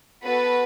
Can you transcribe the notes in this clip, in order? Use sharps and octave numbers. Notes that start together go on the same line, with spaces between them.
B3 F#4 A4 B4